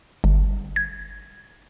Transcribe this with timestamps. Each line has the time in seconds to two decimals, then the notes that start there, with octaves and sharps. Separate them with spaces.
0.24 G1
0.76 G#6